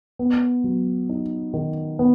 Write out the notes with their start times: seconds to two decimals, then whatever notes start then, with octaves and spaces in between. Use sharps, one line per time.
0.19 B3
0.64 F#3
1.09 D#4
1.54 D#3
1.99 B3